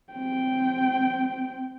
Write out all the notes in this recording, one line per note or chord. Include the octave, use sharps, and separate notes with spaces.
C4 G5